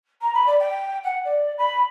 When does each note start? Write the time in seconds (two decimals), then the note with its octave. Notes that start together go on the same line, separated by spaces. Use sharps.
0.21 A#5
0.34 B5
0.46 D5
0.59 G5
1.03 F#5
1.25 D5
1.58 B5